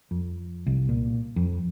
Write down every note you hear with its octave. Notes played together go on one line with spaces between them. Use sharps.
F2
C2
A#2
F2